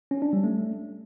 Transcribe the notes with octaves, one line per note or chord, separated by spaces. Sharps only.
C#4
D4
G3
A3